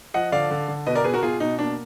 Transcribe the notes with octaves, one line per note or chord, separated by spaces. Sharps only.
F3 D#5 F#5
D3 D5 F5
D3
D3
B2 B4 D#5
A#4 D5
B2 G#4 B4
F#4 A#4
B2 F4 G#4
B2 D#4
A#3 D4